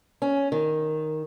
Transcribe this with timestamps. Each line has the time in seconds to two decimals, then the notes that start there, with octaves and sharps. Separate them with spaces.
0.22 C#4
0.52 D#3